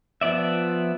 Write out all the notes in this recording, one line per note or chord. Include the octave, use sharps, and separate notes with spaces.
F3 B3 D5 E5